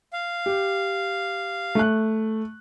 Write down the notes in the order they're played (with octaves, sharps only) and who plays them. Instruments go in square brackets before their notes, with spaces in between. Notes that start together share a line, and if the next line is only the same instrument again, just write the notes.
[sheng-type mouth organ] F5
[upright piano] G4
A3 F#6